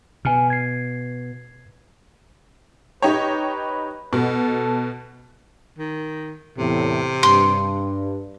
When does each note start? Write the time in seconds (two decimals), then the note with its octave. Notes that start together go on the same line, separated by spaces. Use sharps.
0.25 B2 G#5 F6
0.50 G#6 C7
3.02 D#4 G4 B4 C#5
4.13 B2 A4
5.79 D#3
6.58 E2 A2 C3
7.23 G2 C6